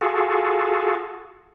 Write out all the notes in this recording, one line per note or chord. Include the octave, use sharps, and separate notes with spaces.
F4 F#4 G#4 A4